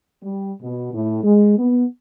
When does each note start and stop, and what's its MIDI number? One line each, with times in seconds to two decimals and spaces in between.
0.23 0.52 55
0.62 0.91 47
0.94 1.20 45
1.24 1.58 56
1.58 1.84 59